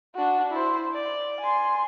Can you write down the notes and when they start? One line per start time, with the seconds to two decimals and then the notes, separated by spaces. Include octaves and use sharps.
0.15 D4 F#4
0.51 E4 C5
0.93 D5
1.40 G#5 C6